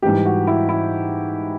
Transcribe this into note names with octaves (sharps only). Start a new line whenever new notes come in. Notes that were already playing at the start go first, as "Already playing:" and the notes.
G#2 E3 G3 G4
F#4
E4
E4